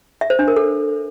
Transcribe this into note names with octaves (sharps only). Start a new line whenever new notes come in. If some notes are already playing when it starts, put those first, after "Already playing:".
E5
C5
D4
A#4
A4